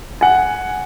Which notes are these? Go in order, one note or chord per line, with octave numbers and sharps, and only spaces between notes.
F#5 G#5